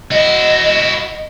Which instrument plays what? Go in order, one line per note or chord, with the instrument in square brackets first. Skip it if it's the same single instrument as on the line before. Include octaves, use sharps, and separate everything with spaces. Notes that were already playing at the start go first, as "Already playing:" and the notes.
[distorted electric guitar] E4 F#4 [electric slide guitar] D#5